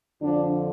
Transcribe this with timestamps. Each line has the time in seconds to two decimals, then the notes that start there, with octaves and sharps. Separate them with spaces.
0.22 F2 D3 F3 D4